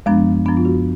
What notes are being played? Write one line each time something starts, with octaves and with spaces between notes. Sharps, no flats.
F#2 F3 G#3 B3 D4
F#2 F3 B3 D4
F4
F#4